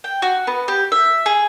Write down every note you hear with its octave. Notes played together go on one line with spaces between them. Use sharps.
G5
F#4
B3
G4
E5
G#4